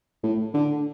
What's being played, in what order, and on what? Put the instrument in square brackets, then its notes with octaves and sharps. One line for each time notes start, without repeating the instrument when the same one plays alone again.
[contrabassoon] A2
D3